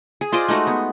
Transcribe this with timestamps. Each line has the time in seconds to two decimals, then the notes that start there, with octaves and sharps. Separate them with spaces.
0.21 G#4
0.32 F4 C5 D5 D#5
0.48 G#3 A3 D#4 F#4
0.67 B3